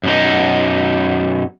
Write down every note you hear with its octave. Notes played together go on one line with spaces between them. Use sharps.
F#2 B2 D#4